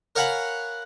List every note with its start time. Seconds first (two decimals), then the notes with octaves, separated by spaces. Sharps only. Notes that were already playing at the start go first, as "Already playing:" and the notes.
0.16 A#4 C#5 F5 F#5 G#5 B5